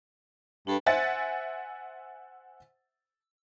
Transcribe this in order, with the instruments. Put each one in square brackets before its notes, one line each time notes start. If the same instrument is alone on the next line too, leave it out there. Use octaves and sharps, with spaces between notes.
[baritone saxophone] G2 [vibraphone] D4 A4 B4
[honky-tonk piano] C5 E5 F#5 G#5 A6